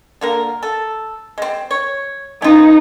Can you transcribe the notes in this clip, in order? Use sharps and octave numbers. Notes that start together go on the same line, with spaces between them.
D3 A#3 A#4
A4
G#3 C4
C#5
C#4 D#4 F4 B4